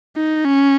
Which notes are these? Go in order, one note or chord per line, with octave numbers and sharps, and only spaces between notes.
D#4
C#4